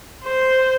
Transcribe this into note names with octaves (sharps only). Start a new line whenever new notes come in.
C5